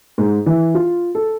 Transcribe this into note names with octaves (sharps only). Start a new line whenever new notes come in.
G#2
E3
F4
A4